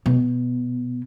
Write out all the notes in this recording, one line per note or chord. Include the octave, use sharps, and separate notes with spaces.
B2